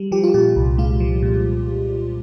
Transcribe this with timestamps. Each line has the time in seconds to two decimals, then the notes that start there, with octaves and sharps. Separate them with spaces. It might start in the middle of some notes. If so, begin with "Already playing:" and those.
Already playing: G3
0.12 F3 G4
0.23 F4
0.34 A#2 G4
0.56 C2
0.78 G#3 F4
1.00 F3
1.22 A#2